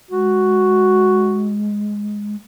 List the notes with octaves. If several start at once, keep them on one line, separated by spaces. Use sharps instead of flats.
G#3 F#4